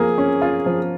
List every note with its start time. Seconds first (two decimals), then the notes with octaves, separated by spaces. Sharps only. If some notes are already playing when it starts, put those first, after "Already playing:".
Already playing: F3 A#3 G#4
0.18 C#4
0.42 F4
0.66 F3